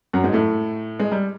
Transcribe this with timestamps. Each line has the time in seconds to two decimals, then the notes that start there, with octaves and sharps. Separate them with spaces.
0.13 F#2 F#3
0.23 G#2 G#3
0.32 A2 A3
1.00 G#3
1.11 G3